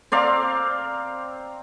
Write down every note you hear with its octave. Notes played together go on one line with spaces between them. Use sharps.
C4 D5 F5 A#5